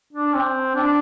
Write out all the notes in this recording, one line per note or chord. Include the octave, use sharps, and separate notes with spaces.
D4
C4
D4